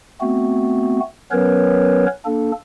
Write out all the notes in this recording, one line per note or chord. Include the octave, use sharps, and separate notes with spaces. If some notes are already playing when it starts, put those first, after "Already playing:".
A3 B3 C4 F#4
F#3 B3 C#4 A#4 B4 C#5
A#3 D4 A4